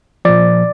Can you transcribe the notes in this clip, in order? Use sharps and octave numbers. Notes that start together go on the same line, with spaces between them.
A#2 F3 D5